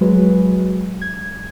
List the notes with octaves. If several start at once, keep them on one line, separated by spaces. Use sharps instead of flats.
F#3 G#3 F#4 B4
G#6